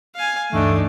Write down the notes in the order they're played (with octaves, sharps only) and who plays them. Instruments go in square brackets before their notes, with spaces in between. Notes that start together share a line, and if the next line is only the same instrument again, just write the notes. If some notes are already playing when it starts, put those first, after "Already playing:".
[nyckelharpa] F5 G#5
[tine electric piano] D2 G2 E3 [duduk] A3 [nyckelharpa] D4 D#4